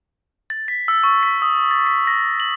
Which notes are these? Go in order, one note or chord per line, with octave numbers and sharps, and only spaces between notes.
A6
B6
E6
C#6
B6
D#6
A6
B6
A#6
F#7